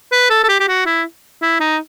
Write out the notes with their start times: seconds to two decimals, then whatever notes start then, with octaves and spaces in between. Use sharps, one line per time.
0.12 B4
0.30 A4
0.44 A4
0.49 G4
0.60 G4
0.68 F#4
0.86 E4
1.42 E4
1.60 D#4